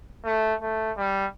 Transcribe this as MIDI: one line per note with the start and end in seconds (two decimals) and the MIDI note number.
0.25 0.54 57
0.62 0.92 57
0.97 1.26 55